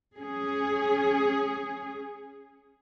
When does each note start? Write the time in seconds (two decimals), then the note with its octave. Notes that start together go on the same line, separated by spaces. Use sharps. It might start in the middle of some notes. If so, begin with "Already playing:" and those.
0.18 C#4 G#4